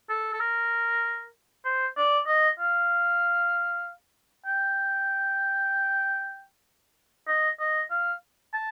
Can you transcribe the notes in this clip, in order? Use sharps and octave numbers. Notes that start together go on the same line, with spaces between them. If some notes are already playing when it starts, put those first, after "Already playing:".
A4
A4
A#4
C5
D5
D#5
F5
G5
D#5
D#5
F5
A5